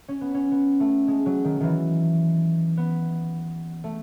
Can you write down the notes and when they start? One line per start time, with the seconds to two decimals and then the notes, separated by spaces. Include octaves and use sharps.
0.08 C#4
0.21 B3
0.34 C#4
0.51 B3
0.80 A3
1.08 G#3
1.26 F#3
1.45 D#3
1.60 D#3 E3
2.77 B3
3.84 A3